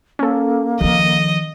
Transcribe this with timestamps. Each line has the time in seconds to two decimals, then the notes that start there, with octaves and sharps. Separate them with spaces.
0.19 A#3 C#4 A4
0.81 D#3 F3 D#5